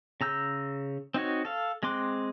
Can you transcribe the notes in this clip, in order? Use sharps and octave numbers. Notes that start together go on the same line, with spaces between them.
C#3 A#5 E6 G6
C4 D#4 F#4 C#5
A4 F5
G#3 C4 C6 D6 F#6